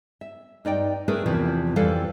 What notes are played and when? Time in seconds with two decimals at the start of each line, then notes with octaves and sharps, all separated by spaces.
0.21 E5
0.65 G2 D#4 D5 G5
1.08 A3 D4 G#4 A#4 B4 E5
1.26 E2 C3 E3 F3
1.76 F2 E3 G3 A4 B4 F5